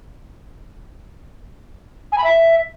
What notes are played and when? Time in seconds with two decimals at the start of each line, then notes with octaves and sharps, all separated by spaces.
2.12 G#5
2.18 B5
2.24 E5